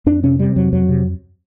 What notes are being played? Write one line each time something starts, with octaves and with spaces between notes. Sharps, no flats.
F2 D4
C3 C#4
C3 G3
F2 F#3
F2 F#3
C3